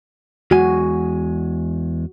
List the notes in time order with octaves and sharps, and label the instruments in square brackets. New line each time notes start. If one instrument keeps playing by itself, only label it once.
[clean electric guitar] E2 G#3 G#5 [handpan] F#4